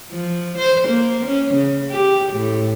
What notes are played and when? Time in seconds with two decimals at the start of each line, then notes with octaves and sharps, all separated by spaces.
0.11 F3
0.58 C5
0.88 A#3
1.26 C#4
1.54 C#3
1.90 G4
2.32 A2